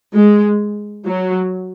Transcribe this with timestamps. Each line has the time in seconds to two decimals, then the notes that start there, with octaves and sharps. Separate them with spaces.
0.14 G#3
1.06 F#3